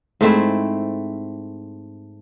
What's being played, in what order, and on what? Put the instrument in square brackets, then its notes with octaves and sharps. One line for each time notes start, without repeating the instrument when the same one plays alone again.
[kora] G#2 A3 C4 E4